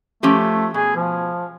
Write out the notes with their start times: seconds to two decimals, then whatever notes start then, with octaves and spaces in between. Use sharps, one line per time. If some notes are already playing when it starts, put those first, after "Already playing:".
0.23 F3 A3 C#4 G4
0.74 B2 G#4
0.96 F3